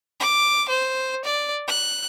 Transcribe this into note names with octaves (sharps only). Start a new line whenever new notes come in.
D6
C5
D5
F#6